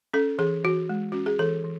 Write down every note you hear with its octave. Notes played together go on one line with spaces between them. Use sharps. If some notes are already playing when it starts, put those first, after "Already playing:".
C#4 A4
E3 G#4
E3 F#4
G#3
C#4 F#4
G#4
E3 A4
E3